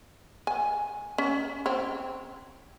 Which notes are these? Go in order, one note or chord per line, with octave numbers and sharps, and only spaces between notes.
G#5
C#4
C4 C#5